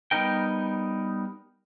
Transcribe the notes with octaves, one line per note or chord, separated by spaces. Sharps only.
G3 B3 D#4 A#4 G5